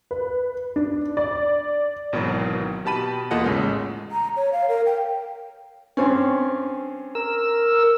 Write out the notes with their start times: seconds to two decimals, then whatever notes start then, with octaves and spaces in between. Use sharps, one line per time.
0.11 B4
0.76 D4
1.17 D5
2.13 G#1 B2 D#3 E3 F#3
2.85 B2 G4 A5 B5 D#7
3.31 E2 A#3 F4 A4 D#5 F#5
3.44 A1 C#3 G#3
4.12 A#5
4.37 C#5
4.53 F5
4.69 A#4
4.86 G5
5.97 G2 C4 C#4
7.15 A#4 E6